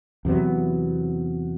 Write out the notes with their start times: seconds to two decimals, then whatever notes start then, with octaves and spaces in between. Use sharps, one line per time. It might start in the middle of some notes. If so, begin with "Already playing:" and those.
0.25 E2 C3 F#3 B3